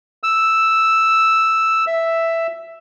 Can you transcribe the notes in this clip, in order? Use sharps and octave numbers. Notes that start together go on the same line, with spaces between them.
E6
E5